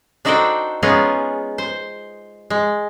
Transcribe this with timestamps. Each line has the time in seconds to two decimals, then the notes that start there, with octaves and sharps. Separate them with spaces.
0.25 D4 D#4 F#4 A4 C5 G5
0.83 G#3 B3 C#4 D#4 F4 G#4
1.58 C5
2.50 G#3